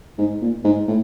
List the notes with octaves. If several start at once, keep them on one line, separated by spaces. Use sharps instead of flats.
G#2
A#2
G#2
A2